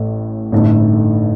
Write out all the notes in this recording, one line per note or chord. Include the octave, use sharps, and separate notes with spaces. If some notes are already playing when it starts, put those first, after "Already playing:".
Already playing: A1 A2 A3
A1 G2 D3 A3 D#4